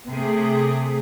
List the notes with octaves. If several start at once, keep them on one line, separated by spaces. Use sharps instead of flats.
C3 A3 G#4